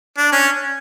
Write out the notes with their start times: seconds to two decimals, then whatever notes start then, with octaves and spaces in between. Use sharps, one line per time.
0.18 D4
0.32 C#4